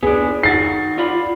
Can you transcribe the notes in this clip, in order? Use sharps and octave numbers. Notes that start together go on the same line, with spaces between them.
B3 D4 G#4
D#3 F#4 A6 C7
F4 D5 B5